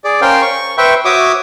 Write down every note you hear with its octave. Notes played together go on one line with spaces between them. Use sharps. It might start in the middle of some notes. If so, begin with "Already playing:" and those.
G#4 D5
C#4 A#4 C5 F5 G5
C#6
B4 C5 E5 G5 C#6
F#4 C#5 E5 D6 D#6